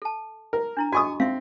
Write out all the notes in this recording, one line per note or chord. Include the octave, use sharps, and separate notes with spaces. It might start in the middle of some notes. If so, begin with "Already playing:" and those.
A4 A5
A#4
D4 E4 A#5
F#4 A4 D#5 G#5 C#6 D#6
C4 E5 F5